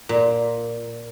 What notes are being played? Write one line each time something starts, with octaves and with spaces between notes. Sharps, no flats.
A#2